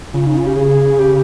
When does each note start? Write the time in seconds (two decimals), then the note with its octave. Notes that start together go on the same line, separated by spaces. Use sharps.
0.14 C#3 F4
0.26 D#4
0.37 F4
0.46 G4
0.56 G#4
0.99 G4